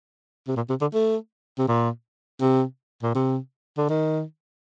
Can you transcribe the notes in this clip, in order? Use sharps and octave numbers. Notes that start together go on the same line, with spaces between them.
C3
A#2
C3
D3
A3
C3
A#2
C3
A#2
C3
D3
D#3